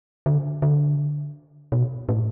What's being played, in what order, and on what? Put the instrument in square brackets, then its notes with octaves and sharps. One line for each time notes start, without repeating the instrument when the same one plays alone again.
[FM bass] D3
D3
B2
A2